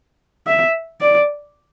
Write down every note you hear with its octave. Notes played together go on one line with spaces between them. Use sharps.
E5
D5